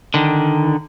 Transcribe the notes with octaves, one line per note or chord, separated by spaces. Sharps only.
D3 D#3